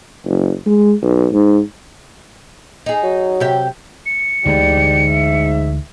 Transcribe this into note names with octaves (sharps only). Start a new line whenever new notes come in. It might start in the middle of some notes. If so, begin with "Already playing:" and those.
F#1
G#3
B1
G#2
D#4 G#4
F#3
C3 G4 E5
C#7
D2 G#2 D3 E3 G4 D5
E5